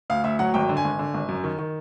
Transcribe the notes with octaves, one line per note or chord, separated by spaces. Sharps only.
D2 F5
D2 E5
F#3 F#5
G#1 G5
D3
G#5
G#1
D3
G#1
F#2
D#3
D#3